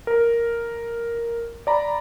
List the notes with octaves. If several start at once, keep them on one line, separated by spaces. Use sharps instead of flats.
A#4
D5 A#5 B5